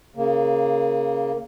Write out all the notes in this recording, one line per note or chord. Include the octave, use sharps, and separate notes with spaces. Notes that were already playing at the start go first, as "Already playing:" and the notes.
C#3 A#3